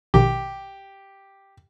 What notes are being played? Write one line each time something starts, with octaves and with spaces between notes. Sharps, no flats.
A#1 B2 D#3 G4